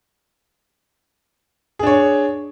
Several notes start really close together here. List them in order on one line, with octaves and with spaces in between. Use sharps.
G#4 D4 C#5